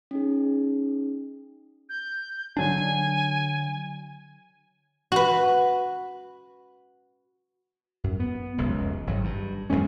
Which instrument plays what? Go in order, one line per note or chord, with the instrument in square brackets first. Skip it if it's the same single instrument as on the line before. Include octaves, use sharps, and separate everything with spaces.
[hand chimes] C#4 D#4 G#4
[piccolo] G6
[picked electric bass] D3 F#3 D4 [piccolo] G#5
[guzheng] F#4 B4
[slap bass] F#2
B3
F1 C#2 F#2
G#1 F#3
G2
E2 G2 G#3 C#4